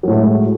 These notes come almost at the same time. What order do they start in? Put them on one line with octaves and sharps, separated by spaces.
F#3 A2 A3 G#3